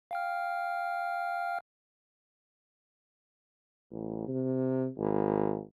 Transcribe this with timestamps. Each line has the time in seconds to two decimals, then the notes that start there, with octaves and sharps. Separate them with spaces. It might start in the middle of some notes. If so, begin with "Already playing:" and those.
0.11 F5 G5 F6
3.91 A1
4.28 C3
4.98 G#1